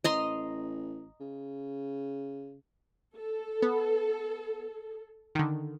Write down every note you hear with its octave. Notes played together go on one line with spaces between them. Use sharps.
A1 D#5 A#5 C6
C#3
A4
B3
D3 D#3